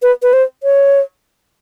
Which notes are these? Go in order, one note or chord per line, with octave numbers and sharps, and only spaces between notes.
B4
B4
C5
C#5